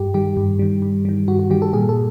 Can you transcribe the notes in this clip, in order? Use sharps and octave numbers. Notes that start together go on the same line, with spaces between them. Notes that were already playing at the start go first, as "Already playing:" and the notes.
Already playing: G2 G4
D#3 G3 G4
G2
D#3 G3
G2
D#3 G3
G2 F#4
F#4
D#3 G3 G4
A4
A#2 G#4
A4